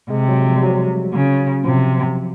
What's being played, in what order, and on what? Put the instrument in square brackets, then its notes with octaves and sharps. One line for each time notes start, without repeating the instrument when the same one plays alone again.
[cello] C3 [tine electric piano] G#3
[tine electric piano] F#3
F3
G3
F#3
[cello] C#3
[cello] C3 [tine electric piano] F3